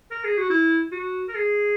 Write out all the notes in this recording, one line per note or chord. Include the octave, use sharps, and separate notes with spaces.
A#4
G#4
F#4
E4
F#4
A#4
G#4